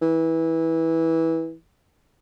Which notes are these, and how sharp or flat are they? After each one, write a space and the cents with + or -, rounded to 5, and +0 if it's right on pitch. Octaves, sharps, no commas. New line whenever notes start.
E3 -15